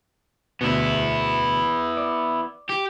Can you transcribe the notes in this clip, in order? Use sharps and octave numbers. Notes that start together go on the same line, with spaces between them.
D2 B2 B3 E4
D5
G4